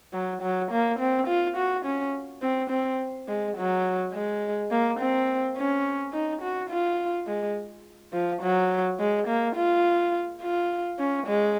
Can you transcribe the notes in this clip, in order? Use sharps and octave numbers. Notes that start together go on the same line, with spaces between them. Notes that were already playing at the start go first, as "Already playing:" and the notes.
F#3
F#3
A#3
C4
F4
F#4
C#4
C4
C4
G#3
F#3
G#3
A#3
C4
C#4
D#4
F#4
F4
G#3
F3
F#3
G#3
A#3
F4
F4
C#4
G#3